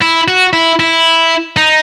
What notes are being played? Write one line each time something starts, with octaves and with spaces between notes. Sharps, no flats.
E4
F#4
E4
E4
D#4